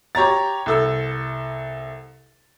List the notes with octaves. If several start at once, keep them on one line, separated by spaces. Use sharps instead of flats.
G4 C#5 A#5 A6
C2 A4 E6